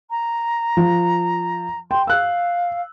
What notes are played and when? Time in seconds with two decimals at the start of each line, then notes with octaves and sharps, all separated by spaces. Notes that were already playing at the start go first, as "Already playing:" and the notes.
0.10 A#5
0.77 F3
1.91 G5 C6
2.07 F5 E6 F#6